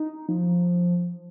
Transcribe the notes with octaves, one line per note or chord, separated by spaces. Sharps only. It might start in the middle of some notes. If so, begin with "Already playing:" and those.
Already playing: D#4
F3